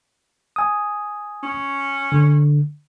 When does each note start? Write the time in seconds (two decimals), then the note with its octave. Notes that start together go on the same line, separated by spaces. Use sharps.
0.56 G#5 D#6
1.43 C#4
2.12 D3